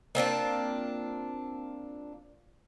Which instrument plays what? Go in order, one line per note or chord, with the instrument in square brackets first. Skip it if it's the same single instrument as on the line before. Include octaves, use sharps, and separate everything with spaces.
[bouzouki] A#3 C4 D4 F4